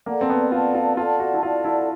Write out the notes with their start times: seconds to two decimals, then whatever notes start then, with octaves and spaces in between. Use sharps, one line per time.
0.06 A#3 A4 D5 F#5 A5
0.21 C4
0.29 B3
0.52 F4 A4 D5 F#5 A5
0.75 F4
0.97 F4 A4 D5 F#5 A5
1.19 F#4
1.34 E4
1.42 F4 A4 D5 F#5 A5
1.64 E4